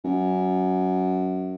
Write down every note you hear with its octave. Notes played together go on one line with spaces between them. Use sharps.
F#2